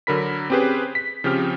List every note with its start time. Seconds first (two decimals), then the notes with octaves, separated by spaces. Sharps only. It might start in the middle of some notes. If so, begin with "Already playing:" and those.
0.07 D3 F#3 A#4 B5 B6
0.50 C4 C#4 G4 G#4 B4 C5
0.95 B6
1.24 C#3 F3 C4 G4 F6